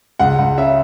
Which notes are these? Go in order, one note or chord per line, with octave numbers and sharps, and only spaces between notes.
C#2 F#5
C#2
C#3 E5